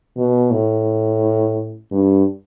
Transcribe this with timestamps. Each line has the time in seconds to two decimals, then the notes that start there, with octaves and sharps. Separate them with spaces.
0.17 B2
0.51 A2
1.91 G2